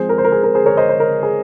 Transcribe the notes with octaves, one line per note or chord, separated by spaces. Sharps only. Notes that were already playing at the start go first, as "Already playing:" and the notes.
Already playing: F3 G#3 C4 G#4 C5
A#4
C5
A#4
G#4
A#4
G#4 C5
A#4 C#5
C5 D#5
C5
A#4
G#4